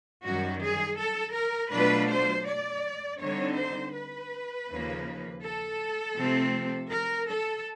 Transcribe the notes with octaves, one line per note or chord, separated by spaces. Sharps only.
F#2 D#3 G3 F#4
G#4
A4
A#4
B2 F#3 A3 D4 F4 B4
C5
D5
D3 G3 C4 D#4 C#5
C5
B4
D#2 C#3 F3 A#3
A4
C3 F3 A3 C4
A#4
A4